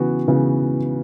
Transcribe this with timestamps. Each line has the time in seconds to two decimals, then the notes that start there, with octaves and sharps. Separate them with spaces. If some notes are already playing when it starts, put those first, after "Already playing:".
Already playing: C#3 E3 B3 F#4
0.27 C#3 E3 B3 F#4